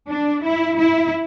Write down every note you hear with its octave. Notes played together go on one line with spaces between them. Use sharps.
D4
E4
E4